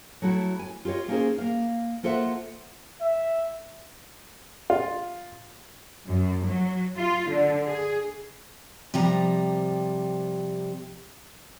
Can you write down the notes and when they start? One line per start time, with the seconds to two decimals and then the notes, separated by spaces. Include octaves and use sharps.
0.22 F#3 A3 E4 F#4
0.59 G#5
0.85 F4 G4 A#4 C#5 D#5
1.08 A#3 C#4 D#4 F#4 G#4 C5
1.38 A#3 F5
2.03 A#3 F4 A4 C5 E5 F#5
3.01 E5
4.70 F4
6.05 F#2
6.45 F#3
6.98 F4
7.29 D3
7.67 G#4
8.94 C3 F3 G3 A#5